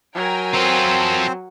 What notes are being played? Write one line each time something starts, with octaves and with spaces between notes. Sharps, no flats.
F#3 A#4 G5 G#5
C4 F4 A4 C5